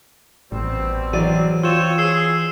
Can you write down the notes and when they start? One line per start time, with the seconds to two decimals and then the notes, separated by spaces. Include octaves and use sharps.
0.52 A1 B2 G3 C4
1.13 E3 F#3 D5 D#7
1.63 C4 F4 C5 C#5 E6 E7
1.98 G#4 E6 C7